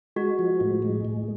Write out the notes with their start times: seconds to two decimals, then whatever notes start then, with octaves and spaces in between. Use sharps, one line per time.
0.16 G#3 F#4
0.39 F3
0.60 A2
0.82 G#3
1.05 A2